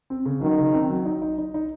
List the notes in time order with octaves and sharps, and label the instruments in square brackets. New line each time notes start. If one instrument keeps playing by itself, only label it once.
[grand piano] C4
C#3
[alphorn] D#3 [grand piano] F#3
[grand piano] C#3
C4
F#3
D#4
D#4
D#4
D#4